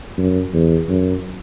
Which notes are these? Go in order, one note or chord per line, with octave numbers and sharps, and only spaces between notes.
F#2
E2
F#2